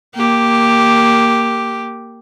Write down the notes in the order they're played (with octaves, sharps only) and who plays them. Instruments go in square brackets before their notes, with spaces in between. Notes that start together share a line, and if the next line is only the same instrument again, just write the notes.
[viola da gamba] A#3 G4